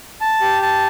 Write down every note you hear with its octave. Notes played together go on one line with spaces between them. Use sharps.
A5
G4
A5